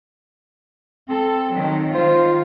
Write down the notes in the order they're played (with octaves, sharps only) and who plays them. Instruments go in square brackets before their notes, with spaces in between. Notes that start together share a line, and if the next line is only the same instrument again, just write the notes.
[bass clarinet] C4 [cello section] A4
[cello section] D#3 F#3
[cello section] D#3 F4 [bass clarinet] C5